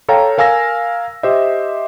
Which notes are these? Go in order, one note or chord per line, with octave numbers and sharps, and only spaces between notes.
A4 C#5 F5 G5 A#5
A#4 F5 G#5 E6 A#6
G4 C5 D#5 E5